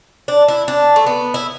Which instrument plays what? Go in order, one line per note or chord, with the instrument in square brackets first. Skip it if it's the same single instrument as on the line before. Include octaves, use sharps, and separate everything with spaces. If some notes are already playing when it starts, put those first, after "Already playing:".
[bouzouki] D4
E4
D4
A3
B3
E4